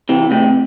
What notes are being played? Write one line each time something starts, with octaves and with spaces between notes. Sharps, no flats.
C3 E3
A2 C3